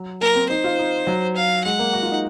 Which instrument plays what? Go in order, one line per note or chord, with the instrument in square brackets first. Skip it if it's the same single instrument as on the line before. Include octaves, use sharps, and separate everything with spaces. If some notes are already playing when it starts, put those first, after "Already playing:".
Already playing: [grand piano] F#3
[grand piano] A#3 [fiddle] A#4
[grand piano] C4
[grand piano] D#4 [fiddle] C5
[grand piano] F4
D#4
F#3
[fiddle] F5
[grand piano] G#3 [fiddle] F#5
[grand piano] A#3
F#4
F4
D#4